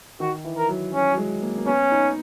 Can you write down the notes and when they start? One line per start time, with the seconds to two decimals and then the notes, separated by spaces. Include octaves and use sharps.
0.20 D#3 F#4
0.45 E3
0.57 A#4
0.69 F#3
0.93 F#3 C#4
1.13 F#3
1.18 G#3
1.42 A#3
1.58 A#3
1.66 B3 C#4
1.91 D#4